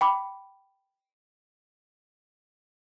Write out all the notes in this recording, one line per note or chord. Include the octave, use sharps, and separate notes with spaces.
G5 B5 D6